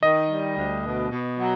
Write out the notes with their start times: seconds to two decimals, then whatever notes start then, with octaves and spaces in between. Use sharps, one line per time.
0.03 D#3 D#5
0.30 G3
0.57 D2
0.85 B2
1.12 B2
1.38 F#3